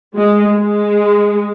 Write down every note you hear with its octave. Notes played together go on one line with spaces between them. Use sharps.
G#3
G#3